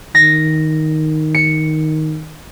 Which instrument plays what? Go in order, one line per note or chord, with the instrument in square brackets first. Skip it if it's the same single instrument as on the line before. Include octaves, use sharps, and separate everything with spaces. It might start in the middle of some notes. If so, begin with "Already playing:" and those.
[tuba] D#3 [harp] A#6
[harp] C#7